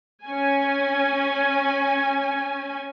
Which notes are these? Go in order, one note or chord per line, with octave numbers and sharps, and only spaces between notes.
C#4 G#5